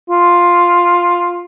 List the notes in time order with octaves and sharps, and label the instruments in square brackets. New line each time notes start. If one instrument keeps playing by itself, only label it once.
[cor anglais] F4